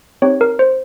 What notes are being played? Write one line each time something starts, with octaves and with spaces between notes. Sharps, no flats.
C4 D#4 G4 C#5
A#4
C5